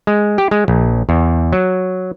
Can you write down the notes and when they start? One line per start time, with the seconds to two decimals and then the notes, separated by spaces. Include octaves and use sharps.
0.07 G#3
0.38 G4
0.51 G#3
0.68 A#1
1.09 E2
1.53 F#3